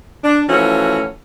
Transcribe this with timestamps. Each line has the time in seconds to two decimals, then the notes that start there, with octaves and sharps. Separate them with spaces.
0.24 D4
0.49 E3 F3 A3 C#4 F#4